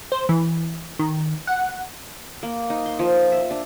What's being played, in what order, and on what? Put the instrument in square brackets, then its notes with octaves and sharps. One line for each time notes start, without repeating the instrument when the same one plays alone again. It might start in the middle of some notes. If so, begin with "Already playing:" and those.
[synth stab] C5
E3
D#3
F#5
[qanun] A#3
D#4
C6
F3
E5
D4